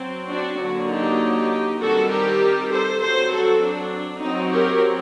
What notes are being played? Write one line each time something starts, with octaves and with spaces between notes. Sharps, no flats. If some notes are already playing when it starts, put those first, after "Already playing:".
Already playing: F#3 C4
D4 F#4
D3 F#3 A#3 D4
D#4 G4
D#3 G3 C4 F#4 A4
G4 A#4
A4 C5
F#3 C4 A4 C5
F#4 A4
D4
F#3 C4 D#4
G4 A#4